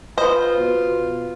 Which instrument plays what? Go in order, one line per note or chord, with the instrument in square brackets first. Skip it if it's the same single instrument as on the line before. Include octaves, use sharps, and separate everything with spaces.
[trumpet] F4 [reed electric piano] B4 [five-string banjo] C5 D#5
[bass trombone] B2